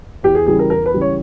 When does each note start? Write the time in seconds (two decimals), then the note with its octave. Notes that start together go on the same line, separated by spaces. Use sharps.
0.23 E2 G4
0.35 G#4
0.46 C#3 E3 G3 G#4
0.59 A#4
0.70 E2 A#4
0.86 B4
0.94 C#3 E3 G3
1.01 C#5